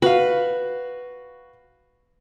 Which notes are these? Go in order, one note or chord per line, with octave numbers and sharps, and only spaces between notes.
F#4 B4 F5